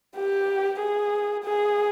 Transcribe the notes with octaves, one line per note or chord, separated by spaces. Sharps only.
G4
G#4
G#4